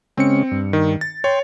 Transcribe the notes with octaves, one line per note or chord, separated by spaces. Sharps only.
C#3 G#3 C4 C#4 C#7
G2
D#3
A6
C#5 G5 C6